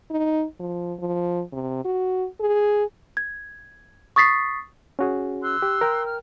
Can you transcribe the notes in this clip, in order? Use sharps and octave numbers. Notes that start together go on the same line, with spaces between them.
D#4
F3
F3
C3
F#4
G#4
G#6
C#6 D#6 A6 B6 C7
C#4 F#4 G#4
C6 E6 F#6
G4
A#4 G5
F6